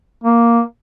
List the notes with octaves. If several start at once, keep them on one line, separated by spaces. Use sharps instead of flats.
A#3